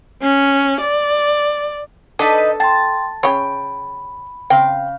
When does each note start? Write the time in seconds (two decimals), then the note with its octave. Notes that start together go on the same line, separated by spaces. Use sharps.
0.22 C#4
0.80 D5
2.19 D4 D#4 A4 B4 D#5
2.60 G5 A5 C6
3.23 C#3 C#5 G5 B5
4.50 C#3 C4 F5 G5